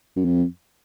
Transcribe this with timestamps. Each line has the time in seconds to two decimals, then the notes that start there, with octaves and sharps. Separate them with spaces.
0.16 F#2
0.25 F2